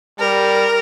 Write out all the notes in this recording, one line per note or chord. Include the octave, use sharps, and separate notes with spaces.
G3 A#4